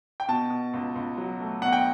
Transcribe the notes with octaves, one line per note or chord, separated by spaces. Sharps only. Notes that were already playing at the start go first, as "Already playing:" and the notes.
G5
B2 A5
B2
C#2
C#2
F#3
A3
B2 F#5
G5